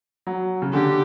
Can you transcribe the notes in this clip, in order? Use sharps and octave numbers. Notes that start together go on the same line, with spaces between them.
F#3
C#3
D3 G4